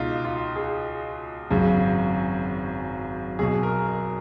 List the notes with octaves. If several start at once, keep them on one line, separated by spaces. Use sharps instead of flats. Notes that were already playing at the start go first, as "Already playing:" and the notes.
Already playing: C#2 B2 D#4 F4
F4
G#4
G#1 F#2 C#3
B1 B2 G#4
A#4
A#4